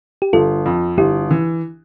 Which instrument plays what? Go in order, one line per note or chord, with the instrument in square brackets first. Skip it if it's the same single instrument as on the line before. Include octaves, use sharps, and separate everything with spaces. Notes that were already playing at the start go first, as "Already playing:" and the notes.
[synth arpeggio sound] G4
[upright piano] G1 [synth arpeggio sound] F4 A4
[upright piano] F2
[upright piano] G1 [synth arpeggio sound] E4 G4
[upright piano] E3